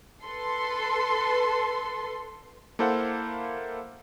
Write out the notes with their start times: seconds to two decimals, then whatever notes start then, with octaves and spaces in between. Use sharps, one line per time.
0.24 A4 B4 C6
2.79 A#3 E4 A4 C5 F5 F#5